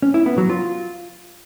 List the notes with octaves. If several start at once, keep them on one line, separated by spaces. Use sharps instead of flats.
C#4
E4
B3
F#3
F4